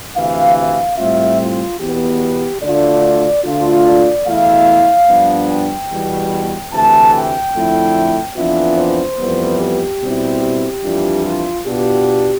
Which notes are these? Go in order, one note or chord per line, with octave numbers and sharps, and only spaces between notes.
D2 C3 E3 F5
F5
A2 G3 C4 F4 E5
F4
E2 B2 B3 G4
D2 D3 A3 D4 F4 D5
D2 D3 A3 D4 F4
D5
E2 B2 A3 E4 F5
G2 F3 B3 D4
G5
E2 B2 G3
D2 C3 E3 A3 A5
G5
F2 D3 A3 E4
F2 E3 B3 D4 F4 E5
C5
F2 E3 G3 B3
G4
B2 G3 C4 E4
G4
F2 E3 G3 D4 F4
F4
B2 B3 D4 F4 G4